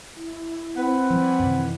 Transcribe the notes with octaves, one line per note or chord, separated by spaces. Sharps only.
E4
C4 B4 F#5
F3 G3 D5 G#5 B5
F#2 C3 D#3 E3